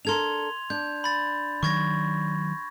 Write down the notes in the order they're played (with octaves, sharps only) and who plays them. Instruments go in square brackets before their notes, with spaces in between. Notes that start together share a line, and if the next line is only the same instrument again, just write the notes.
[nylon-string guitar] D4 A4 A#4 [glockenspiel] C6 G#6 F7
[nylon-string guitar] D4 [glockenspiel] G6
[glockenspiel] B5 A6
[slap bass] D#3 F#3 [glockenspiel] C#6 G#6 A#6